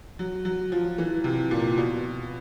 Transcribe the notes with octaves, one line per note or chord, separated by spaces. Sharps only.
F#3
F#3
F3
E3
C3
A#2
B2